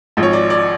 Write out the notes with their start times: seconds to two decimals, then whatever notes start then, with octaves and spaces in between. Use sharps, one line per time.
0.17 G#1 G#2 F3
0.23 C#5
0.33 D5
0.50 D5